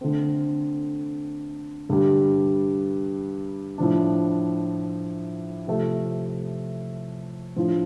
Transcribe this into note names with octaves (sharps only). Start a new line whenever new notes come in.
D3 A3 C4
G2 D3 G3
A2 F3 D4
C3 F3 A3
A2 F3 D4 F4